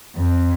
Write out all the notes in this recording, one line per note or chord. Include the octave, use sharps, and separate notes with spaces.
F2